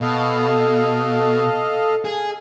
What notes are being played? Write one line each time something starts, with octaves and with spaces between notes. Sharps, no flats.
B2 A4 D#5 F5
G#4